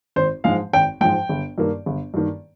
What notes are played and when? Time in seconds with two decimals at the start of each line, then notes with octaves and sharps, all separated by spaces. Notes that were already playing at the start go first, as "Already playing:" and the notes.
0.16 G#1 C5
0.44 G#2 F3 G#3 F5
0.73 G#1 G5
1.01 G#2 F3 G#3 G5
1.29 G1
1.58 G2 D#3 A#3
1.86 G1
2.14 G2 D#3 A#3